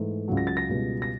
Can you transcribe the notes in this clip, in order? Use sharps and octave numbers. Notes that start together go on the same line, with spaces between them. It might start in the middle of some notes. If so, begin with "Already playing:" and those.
Already playing: G#2 E3 A3
C#2 C#3 F#3
A#6
A6
A#6
C#2 B2 G3
A#6